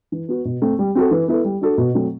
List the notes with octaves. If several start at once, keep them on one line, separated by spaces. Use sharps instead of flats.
E3
B3 F#4
B2
A3 C4
G3
C4 F#4 A4
E3
B3 E4 A4
G3
D4 F#4 A4
B2
F#3 A3 C4 F#4